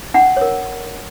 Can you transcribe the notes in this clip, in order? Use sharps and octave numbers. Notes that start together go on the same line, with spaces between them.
D4 F#5
A#4 C#5